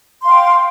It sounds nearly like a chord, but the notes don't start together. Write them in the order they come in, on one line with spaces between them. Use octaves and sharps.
C6 F5 G5